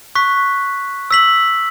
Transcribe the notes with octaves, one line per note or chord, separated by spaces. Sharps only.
C#6 F#6 B6
E6 B6 F#7